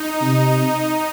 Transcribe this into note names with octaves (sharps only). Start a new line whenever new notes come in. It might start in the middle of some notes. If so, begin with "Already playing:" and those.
Already playing: D#4
C3 D#4